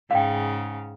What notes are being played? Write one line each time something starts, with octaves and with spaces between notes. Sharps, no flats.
G#2 C#3 F5 G5